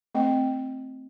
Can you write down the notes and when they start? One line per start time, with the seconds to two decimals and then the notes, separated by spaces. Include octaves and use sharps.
0.15 A3 C4 D#5 F#5 G5